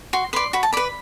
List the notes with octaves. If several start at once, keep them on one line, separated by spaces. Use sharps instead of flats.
F#4 C6
B4 D5 C6
F#4 B5
A5
B4 D5 B5